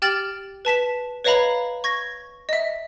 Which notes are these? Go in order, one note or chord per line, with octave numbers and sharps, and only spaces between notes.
G4 G5 F6 A6 F#7
B4 A5 B6 E7
B4 C#5 D#5 F5 A#5 B5
C#6 G#6 A#6
D#5 E5